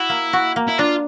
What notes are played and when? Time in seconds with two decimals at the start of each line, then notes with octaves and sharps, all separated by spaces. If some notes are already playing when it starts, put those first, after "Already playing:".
Already playing: E4 F#4
0.09 A#3
0.33 F#4
0.56 A#3
0.68 E4
0.78 D4 F4